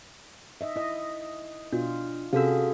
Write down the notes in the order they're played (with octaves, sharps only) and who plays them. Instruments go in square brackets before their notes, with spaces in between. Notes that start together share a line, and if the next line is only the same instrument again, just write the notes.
[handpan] D#4 D#5 E5
E4 D#5
[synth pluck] B2 [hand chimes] D4 [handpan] F4
[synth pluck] C3 E6 [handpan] C#4 G#4 [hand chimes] F#4 A4 F5